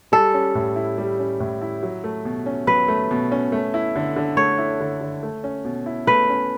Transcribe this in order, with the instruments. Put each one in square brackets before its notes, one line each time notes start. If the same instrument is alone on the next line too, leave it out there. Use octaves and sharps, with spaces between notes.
[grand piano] G3 [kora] A4
[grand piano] C#4
A2
E4
G3
C#4
A2
E4
F#3
A3
B2
C#4
[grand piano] F#3 [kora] B4
[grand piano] A3
B2
C#4
A3
E4
D3
D3
[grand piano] A3 [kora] C#5
[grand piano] E4
D3
D3
A3
C#4
B2
E4
[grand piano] A3 [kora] B4
[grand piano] C#4